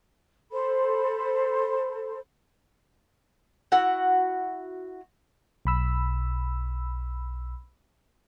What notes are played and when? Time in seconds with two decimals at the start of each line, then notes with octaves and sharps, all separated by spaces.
0.52 A4 C5 B5
3.72 E4 F#4 F#5
5.65 B1 B5 E6